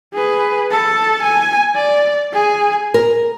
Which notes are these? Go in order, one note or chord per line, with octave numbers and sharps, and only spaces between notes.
G#4 B4
A4 A5
G#5
D5
G#4 G#5
A#4